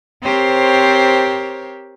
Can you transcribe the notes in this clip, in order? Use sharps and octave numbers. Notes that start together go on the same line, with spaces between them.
C4 G4 A#4 C5 C#5